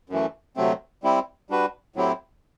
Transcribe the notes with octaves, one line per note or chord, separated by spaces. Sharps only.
F#2 E3 A3
D2 C3 F#3 A3 C4
G3 C4 E4 G4
G3 D4 F#4 B4
A2 F#3 C4 E4 G4